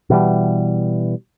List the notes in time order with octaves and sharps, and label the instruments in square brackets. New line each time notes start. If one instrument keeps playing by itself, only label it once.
[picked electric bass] B2 E3 G3